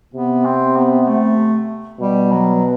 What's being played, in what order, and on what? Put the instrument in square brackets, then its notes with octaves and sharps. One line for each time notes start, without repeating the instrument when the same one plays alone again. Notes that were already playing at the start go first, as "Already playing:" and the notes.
[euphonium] C3 [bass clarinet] B3
[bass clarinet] C4
B3
B3
A3
[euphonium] B2 [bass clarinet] G3
[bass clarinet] F#3